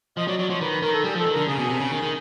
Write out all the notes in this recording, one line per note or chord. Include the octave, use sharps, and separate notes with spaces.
F3 D#5
F#3 D5
F#3 D5
F3 C#5
D#3 B4
B4
D#3 A#4
A4
G3 G#4
F3 A4
D#3
D3 A#4
C#3 G#4
B2
C3
C#3
D#3
D#3